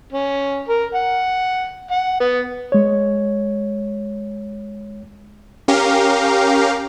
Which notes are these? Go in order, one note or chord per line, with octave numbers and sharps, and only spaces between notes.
C#4
A#4
F#5
F#5
B3
G#3 C#5
C#4 G4 A#4 F5